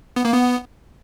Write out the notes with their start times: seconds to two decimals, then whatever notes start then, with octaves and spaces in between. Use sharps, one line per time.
0.16 B3
0.25 A#3
0.33 B3